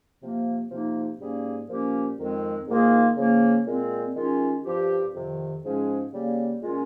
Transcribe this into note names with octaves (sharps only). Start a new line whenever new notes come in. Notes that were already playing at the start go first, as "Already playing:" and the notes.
C3 F3 A#3
C3 F3 A#3 D#4
G#2 G3 A#3 C#4 G#4
A#2 F3 A#3 C#4 G4
F2 D#3 G#3 C4
G#2 D#3 A#3 F4 G#4
C#3 F3 A#3
A#2 G#3 C4
D#3 G#3 C#4 F4
G2 F3 C4 G4
F2 C3 D#3
G#2 F3 G#3 C#4 G#4
C#3 G3 A#3
A#2 G#3 C#4 F4